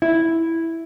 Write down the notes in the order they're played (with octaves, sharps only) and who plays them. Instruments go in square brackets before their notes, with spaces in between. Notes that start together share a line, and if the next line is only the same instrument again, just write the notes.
[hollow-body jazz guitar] E4